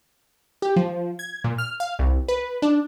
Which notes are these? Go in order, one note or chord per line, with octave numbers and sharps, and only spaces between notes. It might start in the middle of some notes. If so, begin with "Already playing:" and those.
G4
F3
G#6
A#2
F6
F5
C2
B4
D4